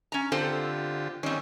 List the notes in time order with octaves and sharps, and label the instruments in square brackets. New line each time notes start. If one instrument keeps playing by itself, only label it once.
[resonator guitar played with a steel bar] C#4 A#5
[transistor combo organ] D3 F4 G4 [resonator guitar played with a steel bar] C4 A4 C5
[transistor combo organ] D#3 C#4 [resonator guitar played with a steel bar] G3 C4